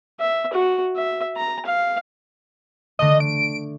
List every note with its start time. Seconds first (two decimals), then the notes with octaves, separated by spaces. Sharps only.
0.20 E5
0.53 F#4
0.96 E5
1.37 A#5
1.66 F5
2.99 D3 A3 D#5
3.20 D7